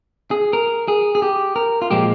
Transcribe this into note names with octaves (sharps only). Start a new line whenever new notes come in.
G#4
A#4
G#4
G#4
G4
A#4
F4
A#2 F3 G#3 G4